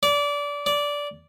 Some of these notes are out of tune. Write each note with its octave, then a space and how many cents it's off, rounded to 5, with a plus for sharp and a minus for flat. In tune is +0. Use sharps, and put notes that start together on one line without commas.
D5 -25
D5 -15